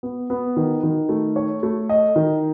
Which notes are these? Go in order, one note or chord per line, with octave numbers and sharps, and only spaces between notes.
B3
B3
D#3
D#3
A3
C#5
A3
D#5
D#3